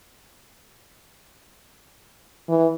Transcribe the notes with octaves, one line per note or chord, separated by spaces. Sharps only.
E3